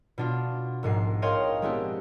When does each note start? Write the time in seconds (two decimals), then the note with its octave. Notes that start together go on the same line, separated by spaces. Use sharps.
0.18 B2 D4 F4
0.83 A#1 G#2 G#3 C7
1.22 A#4 C#5 D#5 F5 G5 C6
1.62 G#3 B3 C4 D4 E4 G4